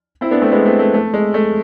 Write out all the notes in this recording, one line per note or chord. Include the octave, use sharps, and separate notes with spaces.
C4 E4
B3 D4
A3 C4
G#3 B3
A3 C4
A3
A3
G#3
A3